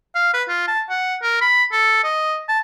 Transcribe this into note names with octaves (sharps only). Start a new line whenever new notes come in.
F5
B4
F4
A5
F#5
A#4
B5
A4
D#5
A5